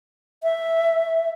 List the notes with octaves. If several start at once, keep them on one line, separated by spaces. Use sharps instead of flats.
E5